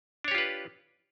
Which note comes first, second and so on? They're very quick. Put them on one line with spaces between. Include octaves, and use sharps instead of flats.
D4 C#5 G4 F4 B4